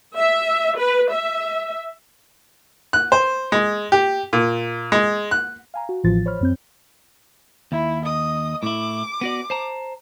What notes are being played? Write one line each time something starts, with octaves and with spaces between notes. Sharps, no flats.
E5
B4
E5
F#6
C5
G#3
G4
A#2
G#3
F#6
F5 G#5 A#5
F#4
A1 A2 E3 F3 F4 A6
C5 C#5 B5 F6
F#2 C4 G6
D#2 E4
D#5 D#6
A2 E4 D6
B3 F#4 D5
C5 A5 A#5